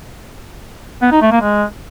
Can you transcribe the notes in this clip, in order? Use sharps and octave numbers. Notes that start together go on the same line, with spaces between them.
B3
D#4
A3
A#3
G#3